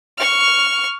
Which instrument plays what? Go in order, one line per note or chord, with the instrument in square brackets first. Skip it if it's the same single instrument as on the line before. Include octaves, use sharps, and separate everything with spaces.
[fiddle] C#6 F6